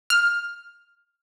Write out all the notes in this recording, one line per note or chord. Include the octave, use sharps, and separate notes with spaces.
F6